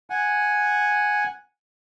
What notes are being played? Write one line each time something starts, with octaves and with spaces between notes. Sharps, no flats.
F#5 G#5